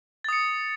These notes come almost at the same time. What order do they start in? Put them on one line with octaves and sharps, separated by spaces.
A6 D#6 C#7